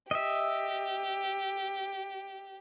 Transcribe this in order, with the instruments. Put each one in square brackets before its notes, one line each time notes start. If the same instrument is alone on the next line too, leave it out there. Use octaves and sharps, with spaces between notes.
[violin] G4 [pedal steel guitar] D#5 E5